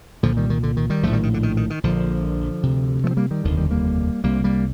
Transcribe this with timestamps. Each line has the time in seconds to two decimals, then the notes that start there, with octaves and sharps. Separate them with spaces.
0.23 C2 A#2 D3 F3
0.37 D#3 G3
0.50 D#3
0.63 D3
0.77 D#3
0.90 D#3 G3
1.03 A#1 A2 F3 A3
1.13 D#3 G3
1.23 D#3
1.34 D3
1.43 D#3
1.57 D#3
1.70 D#3
1.83 A#1 A#2 D3 F3
2.63 D2 C3
3.04 F3 A3
3.11 C4
3.17 G3 A#3
3.31 D#3 G3
3.44 F1 D#2 D3 D#3
3.57 D#3 G3
3.71 G3 A#3
4.24 C2 C3 G3 A#3
4.44 G3 A#3